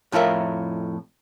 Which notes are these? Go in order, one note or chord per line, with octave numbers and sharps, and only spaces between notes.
F2 A2 F4 A#4 E5